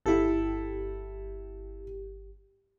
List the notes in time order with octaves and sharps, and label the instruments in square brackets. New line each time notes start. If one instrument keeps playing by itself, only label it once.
[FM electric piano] G1 G4 [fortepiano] E4 A4